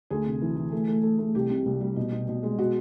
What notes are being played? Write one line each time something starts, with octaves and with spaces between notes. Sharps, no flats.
D2 G#4
C3
E3
E3
A3
A3
A3
A3
C2 G4
C3
C2
G3
B2
B2
B2
G#3
B2 F#4